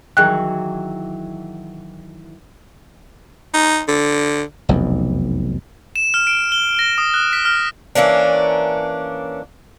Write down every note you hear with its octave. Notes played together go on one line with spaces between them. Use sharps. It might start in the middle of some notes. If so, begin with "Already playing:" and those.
D#3 E3 F#3 G#4 G5 F#6
D#4
D3
F1 B1 E2
E7
F6
D7
G7
A#6
D#6
F#6
B6
F6
E3 A#3 C#4 D4